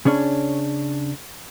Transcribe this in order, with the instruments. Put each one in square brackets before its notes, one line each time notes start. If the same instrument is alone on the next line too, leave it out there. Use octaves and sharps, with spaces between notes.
[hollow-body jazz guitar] C#3 C#4 D4 C#5